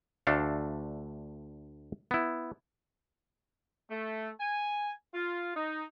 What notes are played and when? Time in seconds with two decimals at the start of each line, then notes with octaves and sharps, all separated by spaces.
0.27 D2 A3 D4 A4 F5
2.11 B3 E4
3.91 A3
4.40 G#5
5.14 F4
5.56 D#4